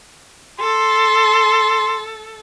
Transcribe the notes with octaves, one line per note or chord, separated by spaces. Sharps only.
A4 C6